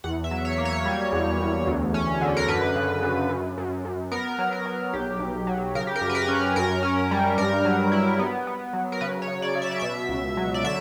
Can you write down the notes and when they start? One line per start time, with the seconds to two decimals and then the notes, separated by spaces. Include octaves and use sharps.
0.04 E2 F#5
0.24 E5
0.31 F#3
0.45 C#5
0.58 A#3
0.65 C#5
0.85 G3
1.12 E2
1.39 E2
1.67 D2
1.94 C#4
2.21 D3
2.37 A#4
2.48 F#2 B4
2.76 C#3
3.03 F#2
3.29 F#2
3.58 F#2
3.85 F#2
4.12 B3 A#4
4.38 F#3
4.53 A#4
4.66 F#3
4.94 B1 G4
5.20 B1
5.47 F#3
5.75 C#3 A#4
5.87 G4
5.96 A#4
6.01 F#2
6.09 B4
6.15 A#4
6.28 C#4
6.56 F#2 A#4
6.83 C#4
7.11 G3
7.38 G2 A#4
7.65 F#3
7.92 E4
8.19 B3
8.47 B3
8.73 F#3
8.92 A#4
9.01 C#3 B4
9.22 C#5
9.28 C#3
9.42 D5
9.55 C#3
9.62 E5
9.71 D5
9.80 B2 E5
10.09 C#2
10.37 F#3
10.54 D5
10.64 D3 E5